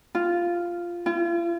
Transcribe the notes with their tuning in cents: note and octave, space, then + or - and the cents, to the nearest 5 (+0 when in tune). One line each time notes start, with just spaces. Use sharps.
F4 -5
F4 -40